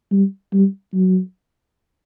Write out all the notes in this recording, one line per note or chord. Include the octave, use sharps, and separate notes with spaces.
G3
G3
F#3